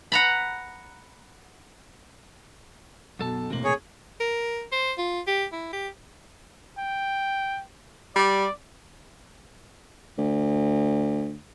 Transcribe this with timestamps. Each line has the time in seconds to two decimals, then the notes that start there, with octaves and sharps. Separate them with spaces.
0.12 F#5 A#5 B5
3.19 B1 F#2 B2 A4 A5
3.50 E1 A2 C3 A#3 F#7
3.64 G#4 C#5
4.20 A#4
4.72 C5
4.98 F4
5.27 G4
5.52 E4
5.73 G4
6.78 G5
8.16 G3 D5
10.18 D2